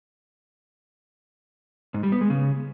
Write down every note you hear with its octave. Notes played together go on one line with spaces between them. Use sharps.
G#2
G3
B3
G#3
C#3